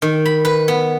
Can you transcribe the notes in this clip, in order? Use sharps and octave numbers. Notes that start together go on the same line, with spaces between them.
D#3
B5
B4
B3